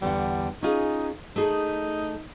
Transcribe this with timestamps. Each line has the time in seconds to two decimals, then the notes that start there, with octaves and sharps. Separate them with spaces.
0.02 E2 D3 G3 F#5
0.63 C#4 D#4 F4 G#4
1.36 A3 D#4 G#4 A4